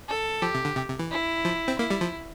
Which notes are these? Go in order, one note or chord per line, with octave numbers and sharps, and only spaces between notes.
A4
F3 G4
C3
D3
C3
C3
E3
E4
F3
C4
A#3 E4
G3
F3